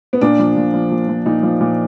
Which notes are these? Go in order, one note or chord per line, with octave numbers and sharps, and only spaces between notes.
B3
A#2 D4
F3
A#2
F3
A#2
F3
A#2 D#4
F3
A#2